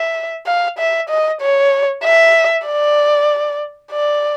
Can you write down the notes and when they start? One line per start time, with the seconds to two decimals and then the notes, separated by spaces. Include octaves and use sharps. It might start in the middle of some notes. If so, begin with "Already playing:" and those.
Already playing: E5
0.46 F5
0.78 E5
1.09 D#5
1.41 C#5
2.04 E5
2.66 D5
3.92 D5